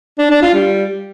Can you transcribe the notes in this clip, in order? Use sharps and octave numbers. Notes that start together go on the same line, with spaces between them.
D4
D4
F4
G3